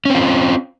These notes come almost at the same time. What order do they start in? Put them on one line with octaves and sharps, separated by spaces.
C#4 C4 F4